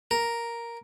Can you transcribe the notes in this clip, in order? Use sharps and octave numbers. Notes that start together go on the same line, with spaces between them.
A#4